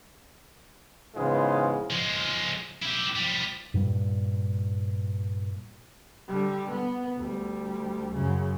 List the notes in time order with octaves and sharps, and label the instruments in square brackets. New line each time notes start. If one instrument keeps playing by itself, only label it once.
[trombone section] G#2 C#3 E3 G#3 B3 F4
[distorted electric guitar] F3 G#3
E4 G4
F3 G3
[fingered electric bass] G2 A#2 G3
[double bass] D3 G3
B3
D2 G3
F#2 C#3